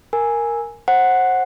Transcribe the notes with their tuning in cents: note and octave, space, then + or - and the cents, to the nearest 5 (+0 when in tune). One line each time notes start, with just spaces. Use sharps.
A#4 +0 G#5 +0
C5 +20 F#5 +0